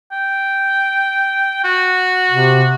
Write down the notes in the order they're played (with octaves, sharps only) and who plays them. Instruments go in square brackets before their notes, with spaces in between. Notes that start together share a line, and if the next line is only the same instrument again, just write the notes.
[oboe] G5
F#4
[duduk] C3